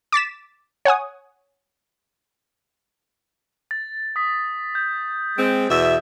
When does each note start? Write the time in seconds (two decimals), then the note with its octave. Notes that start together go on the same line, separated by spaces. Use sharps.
0.12 D6 A6 B6 E7
0.85 C#5 F#5 G#5 D#6
3.71 A6
4.16 D#6 B6
4.75 G6
5.38 G#3 C4
5.70 E2 B2 E5